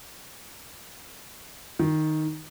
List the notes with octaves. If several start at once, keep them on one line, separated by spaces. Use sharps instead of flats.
D#3